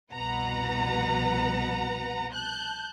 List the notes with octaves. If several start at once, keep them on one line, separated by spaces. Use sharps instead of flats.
C2 F2 B2 B4 F#5 A#5
A5 F#6 G6